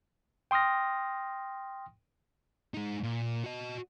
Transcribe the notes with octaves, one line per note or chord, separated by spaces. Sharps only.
G5 C6 D#6 F6 A#6
G#3 D#4
A#2
F#4 D#5